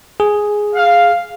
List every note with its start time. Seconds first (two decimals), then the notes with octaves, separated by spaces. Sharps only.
0.20 G#4
0.75 F5